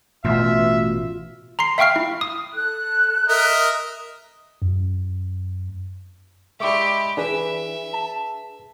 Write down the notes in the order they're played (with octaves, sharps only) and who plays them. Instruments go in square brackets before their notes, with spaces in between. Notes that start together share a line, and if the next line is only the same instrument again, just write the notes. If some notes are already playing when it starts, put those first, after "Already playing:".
[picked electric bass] A1 [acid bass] B2 [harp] F4 [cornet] E5
[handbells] A#5 C6 C7
E5 F5 G5 C#6 F6 C7
E4
D#6
[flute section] A4 F#6
[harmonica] A#4 D#5 E5
[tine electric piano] F#2
[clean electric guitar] G#3 E4 [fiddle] G4 D5 [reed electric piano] E5 C#6 D6
[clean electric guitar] E3 [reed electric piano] D4 G#4 B4 [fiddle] E5
[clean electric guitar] A5